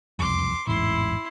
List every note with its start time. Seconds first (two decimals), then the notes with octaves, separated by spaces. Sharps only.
0.19 E1 C2 F2 C6 D6
0.67 A1 E2 G#2 E4 C6